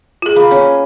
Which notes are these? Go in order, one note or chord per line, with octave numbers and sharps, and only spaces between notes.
F4 G#4
A#3 B4
C#4